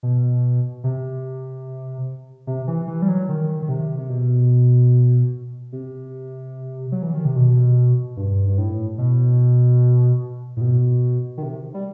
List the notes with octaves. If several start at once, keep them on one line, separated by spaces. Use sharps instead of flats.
B2
C3
C3
E3
E3
G3
F#3
D#3
D#3
C3
C3
B2
C3
F#3
E3
D#3
C3
B2
G2
G2
A2
B2
A2
B2
D#3
C3
G3